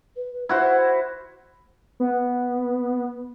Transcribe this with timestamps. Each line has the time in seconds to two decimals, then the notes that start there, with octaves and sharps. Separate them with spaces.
0.16 B4
0.49 E4 F#4 C5 F#5
2.00 B3